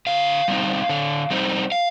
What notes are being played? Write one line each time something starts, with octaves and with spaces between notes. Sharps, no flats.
D3 F5
G3 C4 D#4
D3
G3 C4 D#4
F5